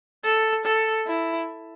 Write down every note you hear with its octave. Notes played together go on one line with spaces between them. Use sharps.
A4
A4
E4